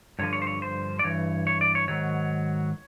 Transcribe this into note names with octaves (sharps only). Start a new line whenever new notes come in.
G2 D3 F3 C#5
C#5
C5
C#5
C5
D5
G2 E3 C#5
C#5
D5
C#5
G#2 D#3 F#3 C#5